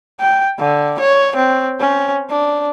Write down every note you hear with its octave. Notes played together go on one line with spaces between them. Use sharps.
G5
D3
C#5
C4
C#4
D4